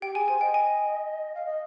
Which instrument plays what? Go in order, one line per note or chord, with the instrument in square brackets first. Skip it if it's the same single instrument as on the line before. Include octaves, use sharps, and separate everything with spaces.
[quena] G4 [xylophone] G5
[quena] G#4 [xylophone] G#5
[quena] C5 [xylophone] G#5
[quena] D#5 [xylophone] G5
[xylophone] G#5
[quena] F5
D#5